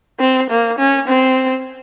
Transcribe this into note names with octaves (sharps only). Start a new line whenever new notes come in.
C4
A#3
C#4
C4